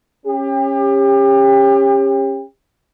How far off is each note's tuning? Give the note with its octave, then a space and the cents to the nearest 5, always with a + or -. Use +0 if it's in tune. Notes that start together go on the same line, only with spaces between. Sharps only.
C#4 -20 G4 +30